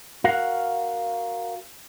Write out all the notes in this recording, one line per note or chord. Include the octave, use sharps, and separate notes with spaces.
F#4 A#4 F5 F#5